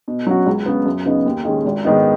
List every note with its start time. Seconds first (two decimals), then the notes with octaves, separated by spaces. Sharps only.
0.08 B2
0.27 F#3 C#4 F#4
0.46 C#2
0.66 C#3 B3
0.85 F#2
1.05 C#3 B3 D#4
1.26 D#2
1.45 D#3 G#3 C#4
1.65 G#1
1.84 G#2 D#3 B3 D#4